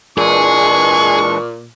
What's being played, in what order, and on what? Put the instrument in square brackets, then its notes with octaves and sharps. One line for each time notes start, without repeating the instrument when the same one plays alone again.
[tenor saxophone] A#2 [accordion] E3 G#3 D4 [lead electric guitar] G#4 [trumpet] C#6